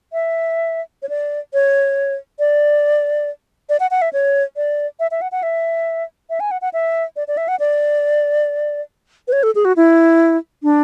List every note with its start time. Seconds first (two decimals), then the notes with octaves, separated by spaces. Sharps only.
0.13 E5
1.02 C#5
1.09 D5
1.54 C#5
2.39 D5
3.69 D5
3.80 F#5
3.91 F#5
4.02 E5
4.13 C#5
4.56 D5
5.00 E5
5.11 E5
5.22 F#5
5.32 F#5
5.43 E5
6.30 E5
6.40 G#5
6.51 F#5
6.62 F#5
6.73 E5
7.16 D5
7.28 D5
7.37 E5
7.48 F#5
7.60 D5
9.28 B4
9.33 C#5
9.43 A4
9.55 G#4
9.65 F#4
9.76 E4
10.63 D4